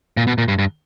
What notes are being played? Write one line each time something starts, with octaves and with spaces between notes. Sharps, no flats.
A#2
B2
A#2
G2
G2